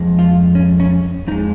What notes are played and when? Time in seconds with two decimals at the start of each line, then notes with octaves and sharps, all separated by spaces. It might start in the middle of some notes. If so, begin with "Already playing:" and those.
Already playing: F2 F3 G#3
0.19 F4
0.55 C#4
0.80 C#4
1.27 F2 F3 G#3 D#4